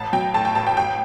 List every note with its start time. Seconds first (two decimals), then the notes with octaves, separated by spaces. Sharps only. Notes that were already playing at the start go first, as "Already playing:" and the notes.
Already playing: A1 A5
0.13 F#3 G5
0.34 A2 A5
0.45 G5
0.55 A1 A5
0.67 G5
0.77 A1 G5